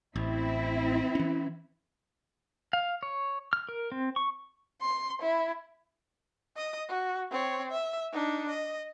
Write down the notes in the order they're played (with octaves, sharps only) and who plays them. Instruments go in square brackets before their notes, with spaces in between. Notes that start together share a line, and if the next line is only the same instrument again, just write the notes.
[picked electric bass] A1 [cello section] C4 E4
[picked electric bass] E3 C#4
[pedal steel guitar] F5
C#5
F6
A#4
C4
C#6
[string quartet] C6
E4
[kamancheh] D#5 D#6
F#4
C4 C#5
E5
D4 D#4
D#5